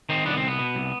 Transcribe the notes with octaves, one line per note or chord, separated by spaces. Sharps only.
D#3 C4 D#4
C2 B3 D4
C4
C2
B3
B2
C2